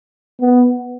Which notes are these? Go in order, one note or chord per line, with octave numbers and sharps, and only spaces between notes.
B3